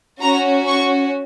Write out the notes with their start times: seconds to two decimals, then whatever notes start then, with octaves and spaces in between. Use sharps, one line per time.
0.21 C#4 F#4 A#5
0.67 C#6